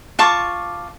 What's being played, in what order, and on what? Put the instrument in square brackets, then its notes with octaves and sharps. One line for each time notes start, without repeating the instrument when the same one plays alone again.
[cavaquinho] F4 A5 C#6 D6